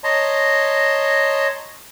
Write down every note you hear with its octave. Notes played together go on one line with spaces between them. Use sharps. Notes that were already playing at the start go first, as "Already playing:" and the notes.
C#5 D#5 A5 A#5 C6